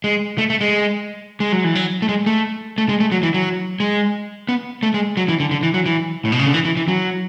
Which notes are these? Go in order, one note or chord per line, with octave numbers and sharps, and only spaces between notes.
G#3
A3
A3
G#3
G#3
F#3
E3
F#3
A3
G#3
A3
A3
G#3
A3
F#3
E3
F#3
G#3
B3
A3
G#3
F#3
E3
D3
D3
E3
F#3
E3
A2
B2
C#3
D3
E3
E3
E3
F#3